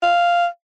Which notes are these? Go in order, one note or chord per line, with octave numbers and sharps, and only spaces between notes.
F5